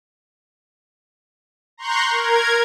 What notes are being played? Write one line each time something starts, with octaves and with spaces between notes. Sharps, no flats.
A#5 C6 C#6 F#6 G6
A#4 G#6